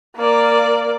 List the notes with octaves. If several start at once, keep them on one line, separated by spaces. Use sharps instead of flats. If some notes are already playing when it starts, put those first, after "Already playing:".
A#3 D5